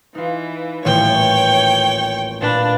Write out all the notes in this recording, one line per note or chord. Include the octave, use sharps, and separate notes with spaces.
E3 D#4 F4
D#1 A1 C#5 G5
A#2 D4 B4 B5